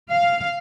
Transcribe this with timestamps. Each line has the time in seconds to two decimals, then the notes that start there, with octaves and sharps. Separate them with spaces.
0.11 F5